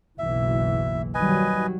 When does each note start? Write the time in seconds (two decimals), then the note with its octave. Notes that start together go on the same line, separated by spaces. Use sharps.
0.19 F#1 B1 E3 E5
1.14 D#3 F#3 G3 B4 D#5 G#5